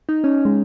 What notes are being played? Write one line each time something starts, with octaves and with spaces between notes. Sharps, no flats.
D#4
C#4
G#3